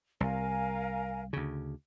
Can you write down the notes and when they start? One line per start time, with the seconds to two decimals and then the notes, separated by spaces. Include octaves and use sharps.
0.20 C2 A#4 F5 G#5
1.33 D2 C#3